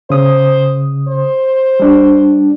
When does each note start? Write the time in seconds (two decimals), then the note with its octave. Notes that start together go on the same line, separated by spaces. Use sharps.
0.10 C#3 C5 D#6
1.08 C5
1.80 G3 D4